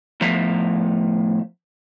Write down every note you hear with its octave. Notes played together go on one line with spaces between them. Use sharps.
A2 F3 B3 E5 F5 A#5